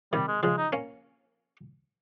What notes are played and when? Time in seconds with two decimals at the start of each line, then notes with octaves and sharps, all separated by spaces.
0.13 C3 D#3 G3
0.28 G#3
0.43 C#3 F3 G#3
0.58 D#4
0.73 A#3 C#4